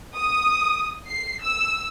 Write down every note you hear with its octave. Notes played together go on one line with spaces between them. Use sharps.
D#6
C7
E6